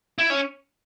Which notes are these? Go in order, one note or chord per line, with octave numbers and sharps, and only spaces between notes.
E4
C#4